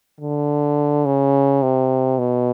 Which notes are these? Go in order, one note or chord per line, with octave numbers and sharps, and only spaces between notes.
D3
C#3
C3
B2